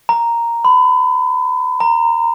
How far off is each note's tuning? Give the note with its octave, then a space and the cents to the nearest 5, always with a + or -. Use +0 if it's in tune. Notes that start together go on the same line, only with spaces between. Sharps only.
A#5 +0
B5 +30
A#5 -10